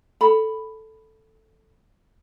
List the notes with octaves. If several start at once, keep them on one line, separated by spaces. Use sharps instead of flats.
A4 B5